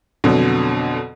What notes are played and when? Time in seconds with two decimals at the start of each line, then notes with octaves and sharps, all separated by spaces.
0.24 F2 B2 D3 F#3